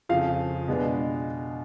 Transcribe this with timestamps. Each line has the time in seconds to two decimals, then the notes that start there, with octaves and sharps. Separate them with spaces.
0.09 F2 C#3 F3 F5
0.68 B2 G#3 B3 D4